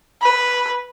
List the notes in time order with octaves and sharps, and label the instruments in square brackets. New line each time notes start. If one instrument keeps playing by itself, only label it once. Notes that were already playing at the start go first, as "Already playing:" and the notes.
[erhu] B4